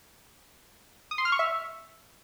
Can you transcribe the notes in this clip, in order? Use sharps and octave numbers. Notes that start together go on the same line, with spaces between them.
D#6
C6
F6
C#6
E5